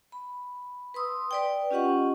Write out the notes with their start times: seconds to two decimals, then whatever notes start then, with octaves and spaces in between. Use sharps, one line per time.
0.12 B5
0.94 B4 C6 D#6 E6
1.31 B4 D5 G5
1.71 C#4 F4 G4 D#5 F#5 C#6